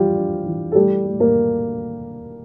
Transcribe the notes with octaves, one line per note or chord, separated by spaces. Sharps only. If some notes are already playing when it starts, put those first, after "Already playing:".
Already playing: F2 E3 G3 D4 F4 G4
D4
E3
A4
G3 A3 G4
A3
A#3 A#4